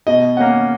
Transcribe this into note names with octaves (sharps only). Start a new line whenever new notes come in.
B2 D#5
A#3 C#4 F#5